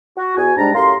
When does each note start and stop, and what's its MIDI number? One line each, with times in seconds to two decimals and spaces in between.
0.17 0.34 66
0.37 0.52 40
0.37 0.52 66
0.37 0.52 80
0.57 0.70 44
0.57 0.70 55
0.57 0.70 56
0.57 0.70 62
0.57 0.70 81
0.57 0.70 82
0.74 0.94 42
0.74 0.94 45
0.74 0.94 67
0.74 0.94 77
0.74 0.94 82
0.74 0.94 84